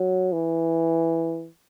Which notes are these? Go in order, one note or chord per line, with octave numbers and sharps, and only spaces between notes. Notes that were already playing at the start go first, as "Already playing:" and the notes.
Already playing: F#3
E3